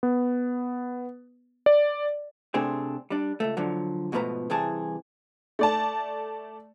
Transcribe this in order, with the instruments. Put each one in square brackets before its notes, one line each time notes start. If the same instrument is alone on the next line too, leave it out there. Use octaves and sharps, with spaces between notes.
[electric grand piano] B3
D5
[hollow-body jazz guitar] C3 A3 C4 D4 G#4
G3 D4
C#2 A3
D3 F3 F#3
G#2 B2 F3 A3 B4 A#5
C2 C3 E3 G#4 A5
[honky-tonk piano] A3 D5 A5